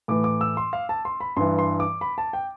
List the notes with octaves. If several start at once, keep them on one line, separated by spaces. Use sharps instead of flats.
A2 E3 D6
D6
E6
C6
F5
A5
C6
B5
G2 E3 C6
C6
D6
B5
A5
G5